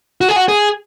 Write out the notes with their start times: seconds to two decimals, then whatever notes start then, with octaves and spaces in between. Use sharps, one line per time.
0.21 F#4
0.29 G#4
0.36 F#4
0.48 G#4